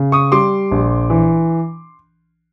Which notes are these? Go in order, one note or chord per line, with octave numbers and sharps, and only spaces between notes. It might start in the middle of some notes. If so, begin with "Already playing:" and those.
Already playing: C#3
C#6 D#6
G3 C6 D6
A#1
E3